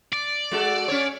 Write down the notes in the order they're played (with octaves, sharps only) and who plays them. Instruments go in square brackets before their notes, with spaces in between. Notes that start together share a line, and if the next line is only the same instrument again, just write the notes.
[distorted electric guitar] D5
[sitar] G#3 F#4 A4
C#4 C#5